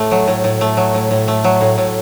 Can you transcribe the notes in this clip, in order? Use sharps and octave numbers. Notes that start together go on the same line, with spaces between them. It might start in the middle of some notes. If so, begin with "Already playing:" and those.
Already playing: A2 A3
F#3
A2
A2
A3
F#3
A2
A2
A3
F#3
A2
A2